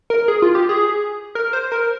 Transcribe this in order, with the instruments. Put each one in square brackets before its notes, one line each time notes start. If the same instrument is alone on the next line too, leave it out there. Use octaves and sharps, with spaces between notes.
[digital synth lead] A#4
G#4
F4
G4
G#4
A#4
C5
A#4